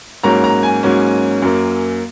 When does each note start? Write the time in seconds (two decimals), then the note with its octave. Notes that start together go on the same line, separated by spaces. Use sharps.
0.23 G#2 F#3 A#3 C#4 A#5
0.44 A#5
0.63 G#5
0.83 G#2 F#3 A#3 C#4
1.42 F#2 F#3 A#3